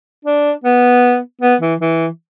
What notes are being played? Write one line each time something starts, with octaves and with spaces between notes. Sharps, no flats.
D4
B3
B3
E3
E3